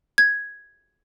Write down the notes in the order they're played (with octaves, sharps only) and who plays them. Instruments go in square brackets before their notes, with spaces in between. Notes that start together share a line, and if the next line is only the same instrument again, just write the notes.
[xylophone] G#6